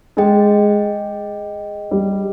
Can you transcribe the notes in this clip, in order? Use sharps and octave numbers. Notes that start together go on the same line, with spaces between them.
G#3 G#4 D#5 G5
G3